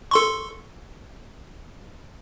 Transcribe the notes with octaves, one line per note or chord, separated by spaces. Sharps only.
A4 C6 C#6